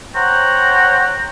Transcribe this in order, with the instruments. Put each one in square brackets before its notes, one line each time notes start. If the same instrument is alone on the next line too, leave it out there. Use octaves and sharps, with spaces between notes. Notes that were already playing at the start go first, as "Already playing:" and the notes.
[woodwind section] C5 C#5 F#5 G5 A#5